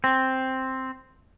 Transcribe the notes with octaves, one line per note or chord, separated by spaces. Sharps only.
C4